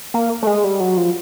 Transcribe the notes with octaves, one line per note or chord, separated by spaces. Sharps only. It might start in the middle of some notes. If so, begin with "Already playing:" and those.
A#3
A3
G#3
G3
F#3
F3